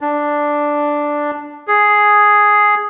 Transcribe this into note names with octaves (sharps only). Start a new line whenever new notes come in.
D4
G#4